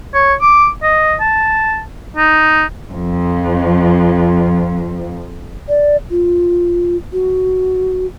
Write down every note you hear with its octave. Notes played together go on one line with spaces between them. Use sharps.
C#5
D6
D#5
A5
D#4
F2 F3
D5
F4
F#4